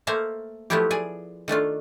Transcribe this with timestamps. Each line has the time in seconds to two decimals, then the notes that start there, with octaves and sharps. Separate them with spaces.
0.07 A3 A#3 C5 E5 F5
0.70 F3 F#3 A3 B3 E4 G4
0.91 G#4 D5 G#5
1.48 D#3 A3 D4 F4